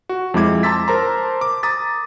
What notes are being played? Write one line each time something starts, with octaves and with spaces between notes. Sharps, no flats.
F#4
F2 G#3 E4 D6 G#6
A5 A#5 C6 E6 A6 B6
A#4 C5 A5 A#5 C6
D6
A#5 D6 D#6 A6 B6